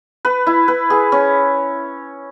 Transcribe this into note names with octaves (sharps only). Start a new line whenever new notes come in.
B4
E4
B4
G#4
C#4